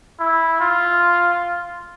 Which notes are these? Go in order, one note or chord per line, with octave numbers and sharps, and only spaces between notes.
E4
F4